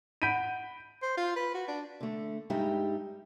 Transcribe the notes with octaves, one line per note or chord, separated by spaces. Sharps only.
F#5 B5 G6 B6 D7 D#7
C5
F4
B4
F#4
D4
D3 A3
G2 G3 G#3 D#4 G4 E5